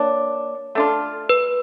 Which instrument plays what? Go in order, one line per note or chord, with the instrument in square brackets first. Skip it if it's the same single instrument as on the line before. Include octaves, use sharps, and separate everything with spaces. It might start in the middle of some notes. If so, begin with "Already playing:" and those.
Already playing: [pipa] A#3 D4 [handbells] C#5
[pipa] A3 D4 F4
[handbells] B4